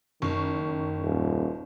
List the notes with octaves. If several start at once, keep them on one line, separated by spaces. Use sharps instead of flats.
F#1 D#3 C#6
D#1